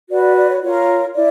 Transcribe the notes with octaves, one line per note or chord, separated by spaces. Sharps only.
F#4 B4 D5
D5
D5
C#5
F4 A#4 C#5
E4 D5